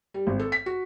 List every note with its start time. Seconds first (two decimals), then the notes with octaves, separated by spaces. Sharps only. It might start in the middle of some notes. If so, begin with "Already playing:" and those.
0.14 G3
0.27 G#1
0.39 A4
0.52 B6
0.66 F#4